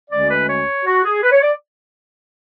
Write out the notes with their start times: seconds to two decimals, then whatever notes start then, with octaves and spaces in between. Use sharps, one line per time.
0.10 D2 D3 G#3 C#4 D5
0.30 B4
0.48 C#5
0.85 F#4
1.04 G#4
1.23 B4
1.32 C#5
1.42 D5